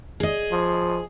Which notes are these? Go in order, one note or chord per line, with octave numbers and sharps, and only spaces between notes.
G#4 D#5
F3